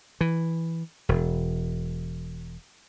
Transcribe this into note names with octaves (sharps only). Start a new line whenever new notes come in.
E3
E1